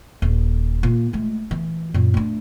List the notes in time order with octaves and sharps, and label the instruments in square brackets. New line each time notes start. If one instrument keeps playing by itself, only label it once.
[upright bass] D#1
A#2 A#3
G#3 A3
E3
F#2 A#2
A3 D4